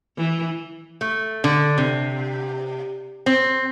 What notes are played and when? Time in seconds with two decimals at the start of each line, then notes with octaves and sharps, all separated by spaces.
0.17 E3
1.01 A3
1.44 D3
1.78 C3
3.26 C4